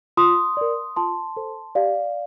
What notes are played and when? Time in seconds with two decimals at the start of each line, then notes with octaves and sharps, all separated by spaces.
0.17 F4 C6 D#6
0.57 A#4 D5
0.96 F4 A5 C6
1.37 A4 C5
1.75 G4 D5 F5